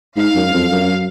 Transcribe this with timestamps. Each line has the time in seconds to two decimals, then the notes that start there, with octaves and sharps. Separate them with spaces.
0.16 G#2 F5
0.36 F#2
0.53 F2
0.72 F#2